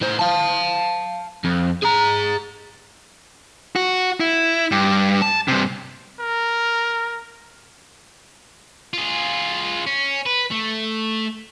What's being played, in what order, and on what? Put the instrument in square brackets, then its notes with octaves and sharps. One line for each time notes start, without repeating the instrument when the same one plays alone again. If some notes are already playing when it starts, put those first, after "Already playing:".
[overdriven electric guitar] A2 C5
F5 A5
F2
G#4 A#5
[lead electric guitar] F#4
E4
G2
A5
G2 C3
[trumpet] A#4
[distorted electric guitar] F4 G#4
C#4
B4
A3